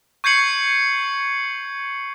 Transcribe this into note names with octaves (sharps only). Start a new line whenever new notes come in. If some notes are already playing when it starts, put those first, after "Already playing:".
C#6 G6 G#6 C7 C#7 F#7